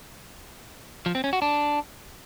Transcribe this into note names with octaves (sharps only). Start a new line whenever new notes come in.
F3
C4
C#4
F#4
D4